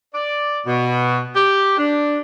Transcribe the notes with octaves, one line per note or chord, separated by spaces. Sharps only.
D5
B2
G4
D4